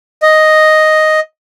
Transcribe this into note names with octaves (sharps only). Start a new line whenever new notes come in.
D#5